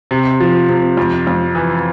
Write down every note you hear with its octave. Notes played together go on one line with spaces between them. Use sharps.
C3
F3
C3
F2
F2
E3